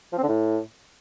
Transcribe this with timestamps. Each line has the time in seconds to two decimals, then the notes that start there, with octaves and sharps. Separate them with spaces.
0.13 F3
0.18 C4
0.23 D3
0.28 A2